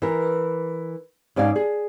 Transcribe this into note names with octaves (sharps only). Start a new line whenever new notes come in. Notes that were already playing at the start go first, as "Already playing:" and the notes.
E3 A#4
G#2 C#4 D5 F5 G#5
G#4